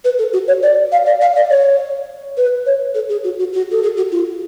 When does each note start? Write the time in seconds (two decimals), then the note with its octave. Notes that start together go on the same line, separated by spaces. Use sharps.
0.05 B4
0.19 A4
0.33 F#4
0.48 C#5
0.62 D5
0.92 F5
1.06 D5
1.21 F5
1.36 D5
1.50 C#5
2.37 B4
2.66 C#5
2.95 A4
3.09 G#4
3.24 F#4
3.39 F#4
3.53 F#4
3.72 A4
3.83 G#4
3.97 F#4
4.11 F4